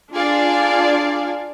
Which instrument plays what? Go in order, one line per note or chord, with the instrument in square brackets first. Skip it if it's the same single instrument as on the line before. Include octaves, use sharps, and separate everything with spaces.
[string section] D4 F4 G#4 D5 F5